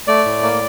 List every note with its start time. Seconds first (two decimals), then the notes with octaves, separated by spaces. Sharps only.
0.08 A3 D5
0.25 A2
0.42 A#3